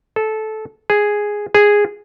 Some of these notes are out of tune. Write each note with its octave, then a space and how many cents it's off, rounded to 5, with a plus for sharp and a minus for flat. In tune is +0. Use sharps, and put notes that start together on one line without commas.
A4 -15
G#4 +0
G#4 -5